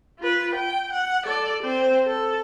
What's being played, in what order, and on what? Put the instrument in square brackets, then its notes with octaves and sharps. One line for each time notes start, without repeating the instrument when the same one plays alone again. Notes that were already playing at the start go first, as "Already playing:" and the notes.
[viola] F4 B4
G5
F#5
A4 D5
C4 C5
A4